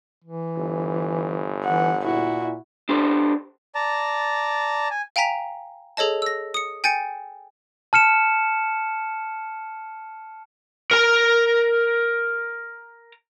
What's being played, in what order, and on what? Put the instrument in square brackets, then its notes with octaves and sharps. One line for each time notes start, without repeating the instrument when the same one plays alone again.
[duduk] E3
[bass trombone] G1
[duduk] E3 [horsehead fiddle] F#5
[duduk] A#2 [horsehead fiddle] E4 F#4
[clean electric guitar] D4 G4 A4 C5
[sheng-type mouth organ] D5 A5 A#5
G#5
[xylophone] F5 G5 G#5 A#5 B6 F7
G#4 A4 C#5 D#5 A5
E6 A#6
D#6 C#7
G5 G#5 G6 A6 C#7
[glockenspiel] A5 F6 C#7 E7
[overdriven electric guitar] A#4 A#5